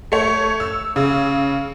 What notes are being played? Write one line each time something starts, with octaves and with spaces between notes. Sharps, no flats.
A3 C#5
E6
C#3